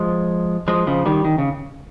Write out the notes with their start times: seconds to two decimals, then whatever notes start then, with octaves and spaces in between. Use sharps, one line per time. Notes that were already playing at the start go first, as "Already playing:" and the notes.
Already playing: F3 G#3
0.68 F3 G#3
0.87 C#3 F3
1.06 D#3 G3
1.25 D#3
1.38 C#3